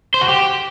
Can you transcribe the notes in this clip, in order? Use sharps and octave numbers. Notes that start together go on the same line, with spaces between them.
C5
F#4
G4